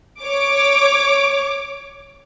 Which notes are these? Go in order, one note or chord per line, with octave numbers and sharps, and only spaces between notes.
C#5 D6